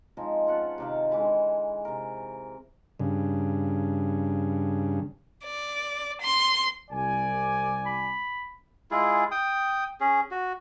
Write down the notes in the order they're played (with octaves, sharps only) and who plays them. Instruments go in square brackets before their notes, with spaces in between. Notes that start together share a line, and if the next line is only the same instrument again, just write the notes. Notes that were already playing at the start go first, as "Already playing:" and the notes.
[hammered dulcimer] F3 G#3 C4 D#4
C#4 F4 F#5 A5
C3 D#3 F5
D3 E3 G#3 B5
C3 A#4
[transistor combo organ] G2 C#3
[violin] D5
C6
[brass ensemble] C2 D5 G#5
[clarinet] B5
[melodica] G#3 E4 F4 G#4
G5 D#6
C#4 G#4
F#4